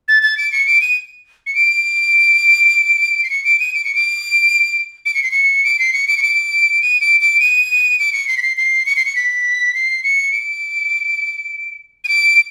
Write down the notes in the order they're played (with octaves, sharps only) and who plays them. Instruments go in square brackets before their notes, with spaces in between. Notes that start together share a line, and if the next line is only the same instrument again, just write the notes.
[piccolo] A6
A6
D7
C#7
D7
D#7
C#7
D7
C7
C#7
D7
D#7
D7
C#7
D7
D7
C#7
C7
C#7
D7
C7
C#7
D7
C#7
D7
D#7
D7
D7
D#7
D7
C#7
C7
B6
C7
C7
C#7
C7
C#7
B6
C7
C#7
D7
D#7
D7